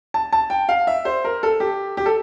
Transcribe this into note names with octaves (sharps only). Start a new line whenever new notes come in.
A5
A5
G5
F5
E5
C5
A#4
A4
G4
G4
A4